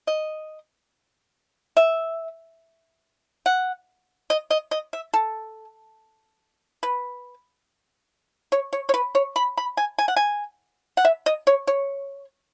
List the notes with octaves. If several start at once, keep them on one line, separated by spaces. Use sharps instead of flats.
D#5
E5
F#5
D#5
D#5
D#5
E5
A4
B4
C#5
C#5
C#5
B4
C#5
B5
B5
G#5
G#5
F#5
G#5
F#5
E5
D#5
C#5
C#5